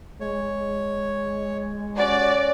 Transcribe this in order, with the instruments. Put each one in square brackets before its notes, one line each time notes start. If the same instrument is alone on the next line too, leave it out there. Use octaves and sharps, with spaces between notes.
[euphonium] G#3 [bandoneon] C#5
[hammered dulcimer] C#4 G4 [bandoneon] F#4 [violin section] D5